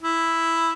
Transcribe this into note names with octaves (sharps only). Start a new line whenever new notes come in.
E4